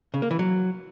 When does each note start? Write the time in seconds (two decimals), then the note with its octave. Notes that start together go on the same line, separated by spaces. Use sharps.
0.14 C#3
0.22 A#3
0.31 E3
0.39 F#3